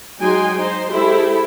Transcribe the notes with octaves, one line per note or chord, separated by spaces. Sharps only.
F#3 G#3 D#4 G5 G#5 C6
D#4 C5 C6
G#3 E4 G4 A4 C5